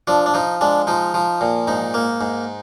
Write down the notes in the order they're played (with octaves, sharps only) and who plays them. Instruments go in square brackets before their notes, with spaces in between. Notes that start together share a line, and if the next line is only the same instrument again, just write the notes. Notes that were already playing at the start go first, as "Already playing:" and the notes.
[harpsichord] F3 D4
D4
F3 D#4
G#3 D4
F3 D#4
F3
A#2
G#2 D#4
A#3
G#2